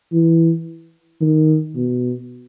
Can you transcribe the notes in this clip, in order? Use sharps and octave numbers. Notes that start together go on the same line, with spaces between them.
E3
D#3
B2